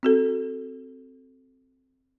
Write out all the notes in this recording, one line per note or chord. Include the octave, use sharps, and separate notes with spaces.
C4 F#4 A4